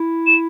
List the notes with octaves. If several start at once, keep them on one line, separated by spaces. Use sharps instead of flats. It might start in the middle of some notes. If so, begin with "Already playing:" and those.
Already playing: E4
E7